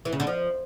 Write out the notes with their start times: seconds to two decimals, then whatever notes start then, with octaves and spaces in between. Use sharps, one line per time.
0.05 E3
0.12 C#3
0.20 D3
0.27 F3